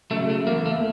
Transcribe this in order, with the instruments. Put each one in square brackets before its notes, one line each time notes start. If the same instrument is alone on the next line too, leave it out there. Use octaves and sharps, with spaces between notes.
[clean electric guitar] C#3 F#3 A3
A3
E2 A#3
A3